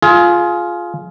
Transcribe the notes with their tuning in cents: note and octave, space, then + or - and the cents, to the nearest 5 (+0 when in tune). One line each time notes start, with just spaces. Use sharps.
F4 +0 G#4 +25